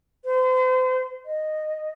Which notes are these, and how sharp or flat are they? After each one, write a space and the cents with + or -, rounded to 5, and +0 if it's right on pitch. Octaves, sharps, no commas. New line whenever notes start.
C5 -35
D#5 -10